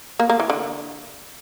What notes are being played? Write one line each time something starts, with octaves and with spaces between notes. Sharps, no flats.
A#3
A#3
E3
D3